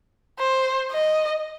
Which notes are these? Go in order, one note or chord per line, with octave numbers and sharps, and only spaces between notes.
C5
D#5